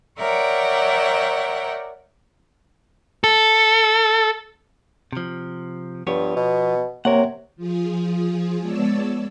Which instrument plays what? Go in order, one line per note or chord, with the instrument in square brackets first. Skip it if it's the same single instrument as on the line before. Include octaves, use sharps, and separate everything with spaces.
[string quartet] A#4 C#5 D5 E5 F#5 G5
[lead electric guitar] A4
[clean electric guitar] C3 F3
[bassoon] G2 [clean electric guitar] F3 B3 C#5
[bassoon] B2
[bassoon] C3 [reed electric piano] A#3 C#5 [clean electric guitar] A#4 F#5
[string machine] F3 F4 G#4
G#3 B3 C#5 D5 A5 E6